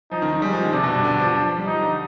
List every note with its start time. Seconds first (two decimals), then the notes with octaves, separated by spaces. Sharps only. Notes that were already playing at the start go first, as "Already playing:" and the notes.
0.11 F3 D#4
0.22 D#3
0.32 D#3
0.42 G3 G#3
0.53 F3
0.63 D#3
0.73 C3 D4
0.83 B2
0.94 G2
1.04 D3
1.20 F3
1.35 F3
1.57 G3
1.66 F3 D#4
1.81 D3